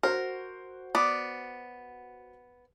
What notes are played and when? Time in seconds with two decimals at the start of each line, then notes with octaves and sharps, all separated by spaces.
0.03 F#4 A#4 C5 F#5
0.95 B3 D5